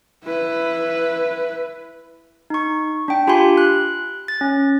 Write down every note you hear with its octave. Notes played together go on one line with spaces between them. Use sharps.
E4 B4
D#4 C#6
D4 G5
F4 G4 G#5 B5 C6
F#6
A6
C#4